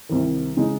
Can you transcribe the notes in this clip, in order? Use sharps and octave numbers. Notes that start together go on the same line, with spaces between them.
C2 C3 D#3
C#3 G#3 D#4